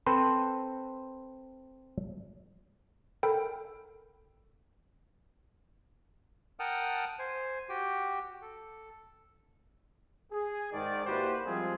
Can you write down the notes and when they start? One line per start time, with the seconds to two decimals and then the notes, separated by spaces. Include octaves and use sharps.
0.06 C4 A4 B4 C5
3.23 A4 A#4 G5 B5
6.60 A#4 F#5 G5 A5 D#6 F6
7.19 C5 G#5
7.69 F#4 G4 G5
8.42 A4
10.32 G#4
10.72 G#2 D#3 D5
11.06 A#3 E4 F#4 G4 B4 C5
11.45 F3 G3 G#3 C4 F4 G#4